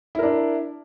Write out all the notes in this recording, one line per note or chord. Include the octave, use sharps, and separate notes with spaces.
D4 E4 A#4